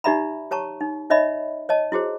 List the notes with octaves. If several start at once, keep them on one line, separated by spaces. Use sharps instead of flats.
D#4 G4 D5 E5 A#5 B5
G4 C#5 A5 A#5 C#6
D#4
D#4 C#5 D#5 E5 B5
C#5 D#5 A5
E4 F#4 G#4 C5